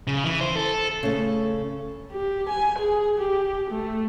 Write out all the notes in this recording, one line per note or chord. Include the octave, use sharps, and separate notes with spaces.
C#3
E3
C5
A4
C#3 A3
G4
G#5
G#4
G4
A3